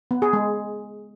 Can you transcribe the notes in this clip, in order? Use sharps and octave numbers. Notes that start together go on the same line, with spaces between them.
B3
G#4
G#3